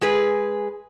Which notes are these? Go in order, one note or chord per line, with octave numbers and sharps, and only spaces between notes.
G#3 G#4 B4